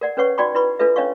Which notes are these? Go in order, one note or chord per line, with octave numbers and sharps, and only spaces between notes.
A#4 D5 F#5
C#4 B4 C#5 F#5 C#6
D#4 F#4 D5 G5 B5 C#6
E4 B4 B5 C#6
D4 F4 A4 B4 E5
C#4 D4 C#5 D#5 F5 C#6